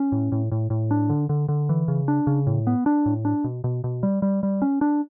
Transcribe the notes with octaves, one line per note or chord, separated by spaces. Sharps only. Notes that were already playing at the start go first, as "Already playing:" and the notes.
Already playing: C#4
A2
A2
A2
A2
D4
D3
D3
D3
E3
C#3
D4
C#3
A2
B3
D4
A2
D4
B2
B2
B2
G3
G3
G3
C#4
D4